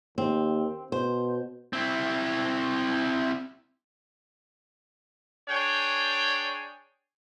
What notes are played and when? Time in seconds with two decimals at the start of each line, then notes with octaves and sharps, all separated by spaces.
0.18 D#2 C4
0.92 B2 C5
1.73 C4 E4
5.49 D4 G#4 C#5 G5